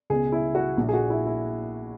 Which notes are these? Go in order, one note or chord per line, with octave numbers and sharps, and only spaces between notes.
C#2 B2 G#4
E4
F#4
A#1 A#2
G#4
F#4
E4
E4